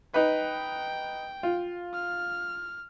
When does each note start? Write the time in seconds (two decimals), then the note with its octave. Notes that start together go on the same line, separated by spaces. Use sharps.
0.14 D#4 B4 G5
1.43 F4
1.94 F6